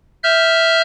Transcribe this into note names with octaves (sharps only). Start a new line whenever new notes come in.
E5 F6 G6